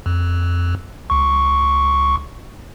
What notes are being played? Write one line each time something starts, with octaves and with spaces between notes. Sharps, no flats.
F2
C#2 C#6